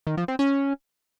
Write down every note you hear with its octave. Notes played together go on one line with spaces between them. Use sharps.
D#3
F3
C4
C#4